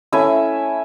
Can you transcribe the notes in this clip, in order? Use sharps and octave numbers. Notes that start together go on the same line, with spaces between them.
A3 C#4 E4 E5 G#5